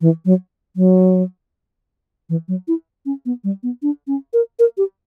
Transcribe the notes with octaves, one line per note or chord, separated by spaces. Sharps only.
E3
F#3
F#3
E3
F#3
E4
C#4
B3
G3
B3
D4
C#4
A#4
A#4
G4